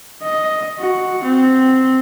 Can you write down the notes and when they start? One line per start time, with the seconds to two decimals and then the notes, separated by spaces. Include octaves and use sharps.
0.23 D#5
0.79 F#4
1.24 C4